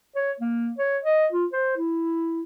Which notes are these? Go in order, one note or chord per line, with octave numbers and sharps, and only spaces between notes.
C#5
A#3
C#5
D#5
F4
C5
E4